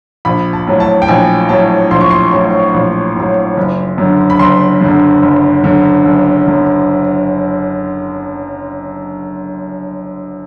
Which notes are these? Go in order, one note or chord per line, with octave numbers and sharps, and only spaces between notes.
A#1 B5
A5
A2 F#3
A5
G5
A#1 G#5
A2 F#3 A5
A#1 C6
C#6
C6
A2 F#3
A#1
A2 F#3
F#1
F#2 D3
B5
F#1 C6
F#2 D3
F#1
F#2 D3
F#1
F#2 D3